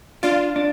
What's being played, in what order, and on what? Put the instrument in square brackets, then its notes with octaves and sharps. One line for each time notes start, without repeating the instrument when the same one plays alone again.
[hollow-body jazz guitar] D4 [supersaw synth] F4
[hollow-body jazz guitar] D4